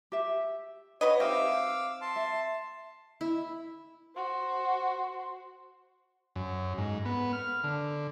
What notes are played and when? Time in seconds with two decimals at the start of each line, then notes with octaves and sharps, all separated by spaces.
0.12 G4 E5
1.01 F#4 B4 C#5 D#5
1.20 C4 D#4 G4 E5 F5 D6 E6
1.51 G4
2.01 A5 C6
2.16 E5
3.21 E4
4.16 F#4 C5
6.36 F#2
6.78 G#2
7.05 B3
7.33 F6
7.64 D3